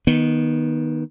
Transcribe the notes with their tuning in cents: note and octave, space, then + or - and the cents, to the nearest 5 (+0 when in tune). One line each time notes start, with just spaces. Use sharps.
D#3 +0 B3 -25